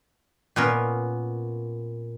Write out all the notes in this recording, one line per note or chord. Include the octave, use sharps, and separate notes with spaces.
A#2 B3 C#4 A#4